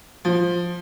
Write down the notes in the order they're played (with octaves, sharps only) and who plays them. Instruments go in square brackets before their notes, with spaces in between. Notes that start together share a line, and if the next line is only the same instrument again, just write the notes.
[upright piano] F3